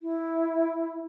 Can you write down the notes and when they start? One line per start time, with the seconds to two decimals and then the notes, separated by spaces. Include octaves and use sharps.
0.01 E4